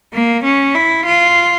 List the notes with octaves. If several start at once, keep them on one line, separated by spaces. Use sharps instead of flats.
A#3
C#4
E4
F4